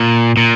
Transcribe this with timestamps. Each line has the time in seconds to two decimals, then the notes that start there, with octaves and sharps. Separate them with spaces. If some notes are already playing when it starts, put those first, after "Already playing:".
Already playing: A#2
0.37 A#2